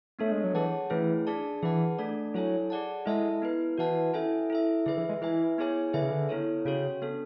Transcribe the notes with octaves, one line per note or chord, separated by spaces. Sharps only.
A3 B3 D4 A4 C#5
G#3
F#3
E3 G#4 C#5 F#5 A5
E3 A3 C#4 E4 G#4 B4
D4 G#4 D5 A5
E3 G#4 B4 F#5 A5
A3 D4 A4 D5
F#3 E4 A4 C#5 G#5
G#4 D5 F#5 A5
G#3 E4 A4 E5 A5
B3 E4 B4
E3 F#4 B4 F#5 A5
C#4 E4 A4 E5 G#5
E4 A4 E5
D3 G#4 B4 E5
E3
G#3
E3 E4 B4 E5 G#5
B3 E4 G#4 C#5 G#5
D3 G#4 B4 E5 G#5
C#3
D3
B3 E4 A4 C#5
C#3 C#4 F#4 C#5
B3 D4 A4